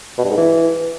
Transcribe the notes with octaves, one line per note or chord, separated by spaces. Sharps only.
B2
G2
G#2
E3